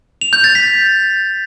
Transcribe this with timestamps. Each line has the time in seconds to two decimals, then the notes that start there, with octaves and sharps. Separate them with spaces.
0.21 F7
0.33 G6
0.44 A6
0.55 B6